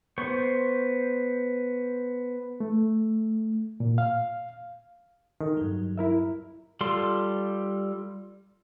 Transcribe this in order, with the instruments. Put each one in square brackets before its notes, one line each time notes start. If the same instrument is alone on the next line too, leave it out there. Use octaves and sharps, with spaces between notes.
[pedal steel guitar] B3 C5 C#6
[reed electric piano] A3
A#2
F5
[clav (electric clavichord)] D#3 [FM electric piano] A4
[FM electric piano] G2 F#3
[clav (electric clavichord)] E4 A#4 E5
[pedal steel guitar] G3 F4 A4 C6